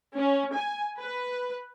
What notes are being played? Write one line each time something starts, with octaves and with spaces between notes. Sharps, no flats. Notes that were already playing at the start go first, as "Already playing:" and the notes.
C#4
G#5
B4